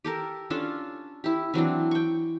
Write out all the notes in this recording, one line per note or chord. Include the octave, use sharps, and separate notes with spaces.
G4 A4 A#4
C#4 D4 F4 A4
E4 G4
E3 F#3 C4 D4
G5 C#6